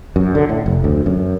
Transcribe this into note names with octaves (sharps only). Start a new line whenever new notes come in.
F#2
D3
A2
F1
D2
F#2